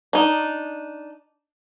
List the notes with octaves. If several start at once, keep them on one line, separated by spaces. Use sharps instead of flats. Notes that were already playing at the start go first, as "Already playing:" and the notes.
D4 D#4